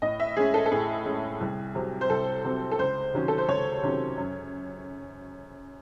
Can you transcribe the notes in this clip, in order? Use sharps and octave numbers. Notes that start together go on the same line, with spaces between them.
A2 D#5
E5
G#3 C#4 G#4
A4
A4
A2 G#4
G#3 C#4
C2
C3 F#3 C4
C5
C2 A4
C3 F#3 C4
A4
C#2 C5
C3 D#3 F#3 C#4
A4
C5
C#2 C#5
C3 D#3 F#3 C#4
F#2